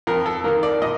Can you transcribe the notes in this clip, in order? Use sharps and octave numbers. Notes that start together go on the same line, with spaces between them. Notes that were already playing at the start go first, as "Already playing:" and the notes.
F2 A#4
A4
D#3 A#3 A#4
D5
A#2 D#5